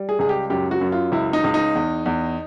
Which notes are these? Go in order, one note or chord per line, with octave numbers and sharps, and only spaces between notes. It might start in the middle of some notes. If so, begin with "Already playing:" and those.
Already playing: G3
G#4
C#2 G#4
G4
F#2 G4
F#4
F#2
F4
C#2 E4
D#4
C#2
D#4
E2
E2